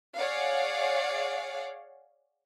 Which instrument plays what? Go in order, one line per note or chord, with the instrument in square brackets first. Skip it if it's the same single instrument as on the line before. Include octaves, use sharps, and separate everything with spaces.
[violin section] G#4 C#5 D5 F5 F#5